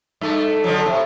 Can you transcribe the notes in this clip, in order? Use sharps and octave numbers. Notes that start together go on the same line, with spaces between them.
G2 A3
D3 F3 F#3
A2 C3